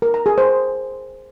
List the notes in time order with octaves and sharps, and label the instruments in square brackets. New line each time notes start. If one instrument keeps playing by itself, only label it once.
[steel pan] A#4
A#5
G#4
C5